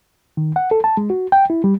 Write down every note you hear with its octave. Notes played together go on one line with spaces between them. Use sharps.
D#3
F#5
A4
A5
G#3
F#4
G5
E4
G3